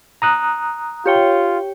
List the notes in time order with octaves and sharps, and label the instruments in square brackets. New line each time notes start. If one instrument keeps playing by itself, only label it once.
[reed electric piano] A#5 D#6 F#6
[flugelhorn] F4 [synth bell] G4 C#5 G5